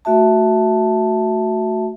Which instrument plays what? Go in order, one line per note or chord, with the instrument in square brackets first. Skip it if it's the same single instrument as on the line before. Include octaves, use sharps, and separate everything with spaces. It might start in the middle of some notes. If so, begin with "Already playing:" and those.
[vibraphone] A3 F#4 E5 A5